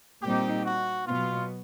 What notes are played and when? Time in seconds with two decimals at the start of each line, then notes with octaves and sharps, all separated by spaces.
0.23 A#2 G3 C4 D#4 G4
0.65 F#4
1.06 B2 F#3 B3 F4